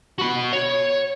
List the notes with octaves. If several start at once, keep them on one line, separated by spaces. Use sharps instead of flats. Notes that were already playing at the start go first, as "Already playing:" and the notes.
F#4 B5
C#5